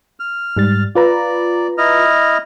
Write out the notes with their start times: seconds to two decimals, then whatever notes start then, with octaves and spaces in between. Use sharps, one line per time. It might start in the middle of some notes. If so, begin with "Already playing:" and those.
0.19 F6
0.57 G#2 G3 A6
0.95 F4 B4 D5 A#5
1.78 E4 D#5 F6